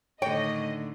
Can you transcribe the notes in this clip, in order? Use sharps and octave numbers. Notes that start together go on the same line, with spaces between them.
A2 D3 D#3 A3 C#5 D#5 G5